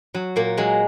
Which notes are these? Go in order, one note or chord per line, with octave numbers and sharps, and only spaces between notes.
F#3
A#2 A#3
F#3 G#3